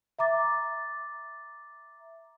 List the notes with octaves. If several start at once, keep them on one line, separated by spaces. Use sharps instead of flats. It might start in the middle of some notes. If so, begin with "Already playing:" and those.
E5 A#5 D6 A6